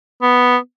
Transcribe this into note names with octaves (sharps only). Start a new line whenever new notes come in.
B3